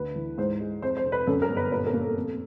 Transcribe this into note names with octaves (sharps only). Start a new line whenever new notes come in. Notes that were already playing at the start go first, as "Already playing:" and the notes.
Already playing: D2 B4
E3
G#2 C5
G#3
F2 C5
C5
F1
B4
F#2 A4
A#4
G1
B4
A#2 B4
A#4
A#3
A4
F2